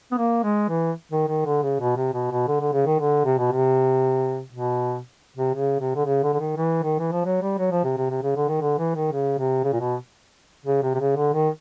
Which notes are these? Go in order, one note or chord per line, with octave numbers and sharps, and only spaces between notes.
B3
A#3
G#3
E3
D#3
D#3
D3
C#3
B2
C3
B2
B2
D3
D3
C#3
D#3
D3
C3
B2
C3
B2
C3
C#3
C3
D3
C#3
D3
D3
D#3
E3
D#3
E3
F3
F#3
G3
F#3
F3
C3
C3
C3
C#3
D3
D#3
D3
E3
D#3
C#3
C3
C#3
A#2
B2
C#3
C3
C3
C#3
D3
D#3